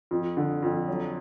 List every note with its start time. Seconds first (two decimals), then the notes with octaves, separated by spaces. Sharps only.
0.11 F2
0.37 D3
0.62 F2
0.88 F#3